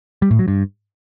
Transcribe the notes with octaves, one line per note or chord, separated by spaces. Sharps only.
G3
A2
F#3
G2